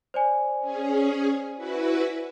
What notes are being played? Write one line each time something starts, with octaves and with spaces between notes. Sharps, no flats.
C5 D5 G#5
C#4 G#4
E4 F#4 B4